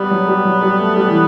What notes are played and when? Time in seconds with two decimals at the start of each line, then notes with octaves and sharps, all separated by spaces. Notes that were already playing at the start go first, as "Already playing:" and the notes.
Already playing: G3 B3
0.11 F#3
0.28 G3
0.45 F#3
0.62 G3
0.79 A3
0.96 G3
1.08 E3